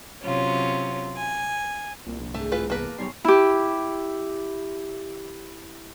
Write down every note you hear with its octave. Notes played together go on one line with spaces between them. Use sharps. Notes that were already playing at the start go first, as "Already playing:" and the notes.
C3 F#3 C#4 F4
G#5
C2 A#2
A#1
G#1 D2 A3
A2 E3 F4 B4
E2 A#3 B4 A5 A#5 D6
B1 G3 C#5 G#5 C6
E4 G4